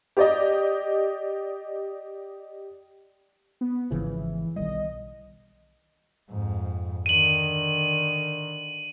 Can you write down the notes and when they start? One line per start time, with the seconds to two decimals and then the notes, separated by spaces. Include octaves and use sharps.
0.17 G4 D5 D#5
3.61 B3
3.91 G#1 C#3 E3 F3
4.56 B1 D#3 G3 D#5
6.30 F2 G#2
7.06 D3 D#3 D#7 F#7